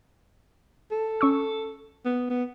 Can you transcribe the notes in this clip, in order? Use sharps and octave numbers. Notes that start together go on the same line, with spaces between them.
A4
C#4 C#6 E6
B3
B3